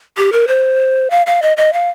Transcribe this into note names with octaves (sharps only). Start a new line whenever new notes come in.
G4
A#4
C5
F5
F5
D#5
D#5
F5